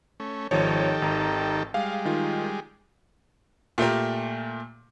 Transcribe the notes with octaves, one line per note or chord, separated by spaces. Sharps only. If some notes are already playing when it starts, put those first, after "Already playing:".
A3 C#4
G#1 D#3 F3 G4 A4 C#5
G#1 A#5
G3 G#3 F5
D#3 F4
A#2 A3 G4 A#4